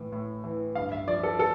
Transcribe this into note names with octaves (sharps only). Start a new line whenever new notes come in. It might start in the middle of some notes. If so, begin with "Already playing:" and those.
Already playing: A2 E3
A2
E3
G2 F5
E5
F3 D5
A4
A4